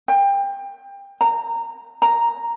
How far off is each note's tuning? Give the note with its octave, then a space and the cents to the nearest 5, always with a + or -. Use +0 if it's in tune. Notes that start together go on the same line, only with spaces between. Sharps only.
G5 +25
A#5 -20
A#5 +0